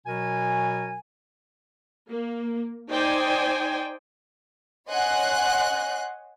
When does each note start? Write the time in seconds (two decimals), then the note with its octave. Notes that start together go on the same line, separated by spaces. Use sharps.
0.07 B2 F#3 A#4 G#5
2.09 A#3
2.90 D#4 C5 D5 G5 G#5
4.89 C#5 D#5 F#5 G#5 C6 F#6